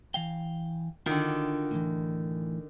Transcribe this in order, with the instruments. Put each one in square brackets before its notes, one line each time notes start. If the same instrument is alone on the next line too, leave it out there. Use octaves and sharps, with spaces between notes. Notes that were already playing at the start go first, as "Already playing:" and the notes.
[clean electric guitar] E3 F5 G5
[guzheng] D3 D#3 [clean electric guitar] D4 F4 F#4
[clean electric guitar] A2 E3